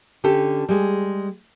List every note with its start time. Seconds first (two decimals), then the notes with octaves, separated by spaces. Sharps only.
0.24 D3 C#4 G4 A4
0.69 G3 G#3